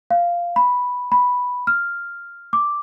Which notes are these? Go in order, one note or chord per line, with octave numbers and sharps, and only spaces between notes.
F5
B5
B5
F6
D6